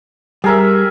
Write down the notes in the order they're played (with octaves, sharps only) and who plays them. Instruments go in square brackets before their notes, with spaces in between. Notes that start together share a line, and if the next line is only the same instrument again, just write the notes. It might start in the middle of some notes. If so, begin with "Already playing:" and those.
[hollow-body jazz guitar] G3 [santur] G#4 A#4 E5